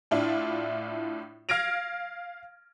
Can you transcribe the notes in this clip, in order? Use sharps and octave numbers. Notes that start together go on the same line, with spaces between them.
A2 D4 E4 F4
F5 F6 G#6 A#6 D7 F7